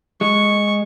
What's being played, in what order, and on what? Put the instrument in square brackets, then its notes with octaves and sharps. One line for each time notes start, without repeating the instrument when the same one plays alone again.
[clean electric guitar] G#3 [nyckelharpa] C#6